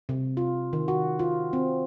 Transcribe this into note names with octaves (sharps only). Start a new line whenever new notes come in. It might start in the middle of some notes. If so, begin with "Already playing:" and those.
C3
F4
D#3
F#4
F4
C4